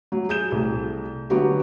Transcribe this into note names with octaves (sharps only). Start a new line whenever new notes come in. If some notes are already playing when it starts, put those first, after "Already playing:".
F#3
G#4 G6 E7
C2 A3 G#4
D3 F#3 B3 F#4 G4